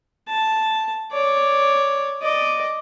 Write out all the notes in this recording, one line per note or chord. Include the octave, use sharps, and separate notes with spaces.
A5
C#5 D5
D5 D#5